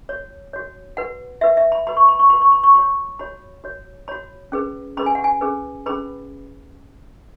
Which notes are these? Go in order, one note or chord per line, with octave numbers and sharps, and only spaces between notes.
F#4 C#5
F#4 C#5
F#4 B4 F#5
F#4 B4 E5
E5
B5
F#4 B4 B5
C#6
B5
C#6
F#4 B4 B5
C#6
B5
C#6
F#4 C#5 B5
F#4 C#5 B5
F#4 C#5
F#4 C#5 B5
C#4 G#4 B4
C#4 G#4 B4 B5
G#5
F#5
G#5
C#4 G#4 B4
C#4 G#4 B4 B5